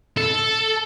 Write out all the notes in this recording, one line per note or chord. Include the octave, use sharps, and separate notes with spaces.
A4